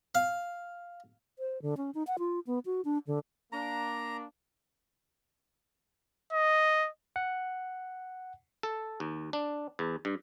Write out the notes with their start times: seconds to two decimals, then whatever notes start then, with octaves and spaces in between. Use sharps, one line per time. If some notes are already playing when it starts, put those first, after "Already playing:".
0.15 F5
1.39 C5
1.62 D3
1.77 C#4
1.95 D#4
2.07 F#5
2.19 F4
2.47 B3
2.66 F#4
2.85 D4
3.07 D3
3.52 A#3 D4 A#5
6.33 D#5
7.16 F#5
8.63 A4
9.00 D#2
9.33 D4
9.79 E2
10.05 G2